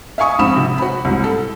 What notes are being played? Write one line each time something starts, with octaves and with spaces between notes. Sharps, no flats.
E5 F5 G#5 C#6 D#6
A#1 G#2 C4 B5 D#6 E7
C3
F#4 B5
C2 G#2
A4